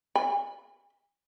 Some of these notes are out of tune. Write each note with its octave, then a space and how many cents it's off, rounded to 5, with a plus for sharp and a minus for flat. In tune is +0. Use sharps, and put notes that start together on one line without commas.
G#5 -35 B5 +0